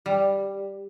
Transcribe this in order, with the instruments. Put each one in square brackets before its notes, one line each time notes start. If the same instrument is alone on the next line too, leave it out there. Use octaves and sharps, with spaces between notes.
[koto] G3